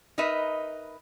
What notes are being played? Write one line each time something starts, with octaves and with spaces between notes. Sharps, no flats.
D#4 A#4 B4 D#5 E5